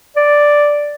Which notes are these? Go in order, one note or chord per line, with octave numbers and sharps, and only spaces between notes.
D5